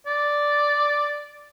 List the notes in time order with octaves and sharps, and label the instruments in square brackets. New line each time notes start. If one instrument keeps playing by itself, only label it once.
[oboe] D5